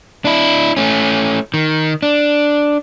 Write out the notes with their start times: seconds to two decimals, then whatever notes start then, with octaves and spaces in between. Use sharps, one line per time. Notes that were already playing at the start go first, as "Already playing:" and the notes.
0.25 D4 E4
0.77 A3 C#4
1.54 D#3
2.03 D4